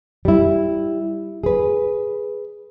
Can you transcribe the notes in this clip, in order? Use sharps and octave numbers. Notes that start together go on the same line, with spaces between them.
G3 E4
G#4 B4